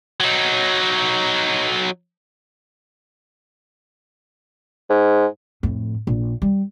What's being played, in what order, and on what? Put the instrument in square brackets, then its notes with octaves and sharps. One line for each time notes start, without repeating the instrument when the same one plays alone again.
[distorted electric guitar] F#3 D#4
[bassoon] G#2
[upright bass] F2 A2
A#1
G3